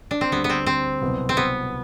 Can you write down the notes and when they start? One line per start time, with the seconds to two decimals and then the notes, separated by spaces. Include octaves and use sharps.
0.11 D4
0.21 C4
0.31 D2 D3 G3 B3
0.44 B3
0.50 C4
0.66 C4
1.01 C2 B2 F#3 B3
1.29 C4
1.37 B3